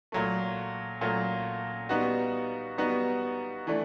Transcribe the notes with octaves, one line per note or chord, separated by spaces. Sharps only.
A#2 F#3 A3
A#2 F#3 A3
G3 B3 D#4 F#4
G3 B3 D#4 F#4
E3 A3 D4